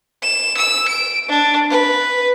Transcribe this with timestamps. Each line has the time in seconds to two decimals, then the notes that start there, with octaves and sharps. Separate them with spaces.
0.23 E7
0.57 E6
0.88 D7
1.28 D4
1.70 B4